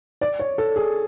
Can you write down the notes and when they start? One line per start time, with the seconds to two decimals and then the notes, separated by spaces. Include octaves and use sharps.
0.21 D5
0.39 C#5
0.58 A4
0.76 G#4